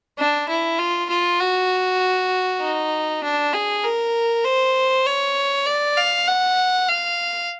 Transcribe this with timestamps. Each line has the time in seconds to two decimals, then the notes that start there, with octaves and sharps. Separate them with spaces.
0.18 D4
0.49 E4
0.79 F4
1.10 F4
1.40 F#4
2.61 D#4
3.23 D4
3.54 G#4
3.84 A#4
4.44 C5
5.06 C#5
5.66 D5
5.97 F5
6.27 F#5
6.88 F5